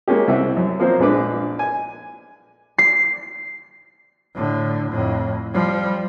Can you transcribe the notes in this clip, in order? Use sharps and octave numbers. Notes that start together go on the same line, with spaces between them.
G#3 A#3 C#4 G4
C2 C4 E5 F#5
F#2
F3 A#3 C4 A#4 C5
A#1 G#3 D4 B4 D6
G#5
C7
A2 D3
F2 A2
F3 G3